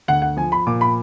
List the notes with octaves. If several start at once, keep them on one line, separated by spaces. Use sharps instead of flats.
D2 F#5
F#5
F3 G#5
B5
A#2 D6
B5